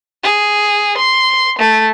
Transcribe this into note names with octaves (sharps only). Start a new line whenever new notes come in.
G#4
C6
A3